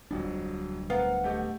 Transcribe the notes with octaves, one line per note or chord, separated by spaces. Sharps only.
D1 F2 F#3 G3 D4
B3 A#4 F5 F#5
A3 G4 D#5